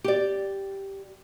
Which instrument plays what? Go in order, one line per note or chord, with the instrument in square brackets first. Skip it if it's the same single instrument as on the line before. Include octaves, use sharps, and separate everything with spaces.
[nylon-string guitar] G4 D5